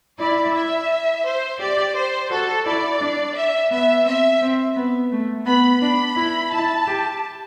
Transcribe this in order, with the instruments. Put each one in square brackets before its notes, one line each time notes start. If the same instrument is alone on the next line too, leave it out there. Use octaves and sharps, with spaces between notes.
[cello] E4 [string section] D5
[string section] E5
C5
[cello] G4 [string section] D5
[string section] C5
[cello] F#4 [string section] A4
[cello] E4 [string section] D5
[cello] D4
[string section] E5
[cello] B3 [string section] E5
[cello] C4 [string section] E5
[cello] C4
B3
A3
[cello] B3 [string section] B5
[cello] D4 [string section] B5
[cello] E4
[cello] E4 [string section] A5
[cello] G4